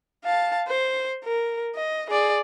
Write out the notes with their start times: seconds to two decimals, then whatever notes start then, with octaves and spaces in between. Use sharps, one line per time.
0.24 F5 A5
0.68 C5
1.24 A#4
1.75 D#5
2.10 G#4 D5